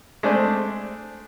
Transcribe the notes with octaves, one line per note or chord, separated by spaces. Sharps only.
G#3 A3 C4 D4